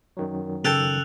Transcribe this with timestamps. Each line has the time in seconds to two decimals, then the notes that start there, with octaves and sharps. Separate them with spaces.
0.17 F#2 D#3 F#3
0.65 C#3 A4 G5 A5 E6 F#6 F7